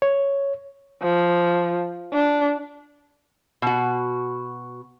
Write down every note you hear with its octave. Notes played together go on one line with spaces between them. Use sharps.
C#5
F3
D4
B2 F#4